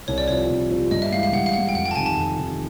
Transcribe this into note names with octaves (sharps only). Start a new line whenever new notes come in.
C2 C#5
D5
C3 F3 C#5
C2
C3 F3
G2 D#5
E5
E3 G#3 F5
F5
G2 F#5
F5
E3 G#3 F#5
G5
F2 F#5
G5
A5
C3 D#3 G#5
A5
F2
C3 D#3